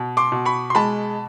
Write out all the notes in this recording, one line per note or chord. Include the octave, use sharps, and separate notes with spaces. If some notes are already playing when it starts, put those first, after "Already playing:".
Already playing: B2
C6 D6
B2
B5 C#6
C6
G#3 A5 B5